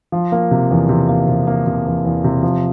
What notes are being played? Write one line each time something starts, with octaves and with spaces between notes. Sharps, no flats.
F3
A#3
C3
E2
C3
A#3
C3
A#3
C3
E2
E2
C3
F3